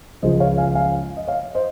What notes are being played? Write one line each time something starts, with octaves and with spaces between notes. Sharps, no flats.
C#2 C#3 F3 C5 D#5
C#5 F5
F5 G#5
F5 G#5
D#5
C#5 F5
C5 D#5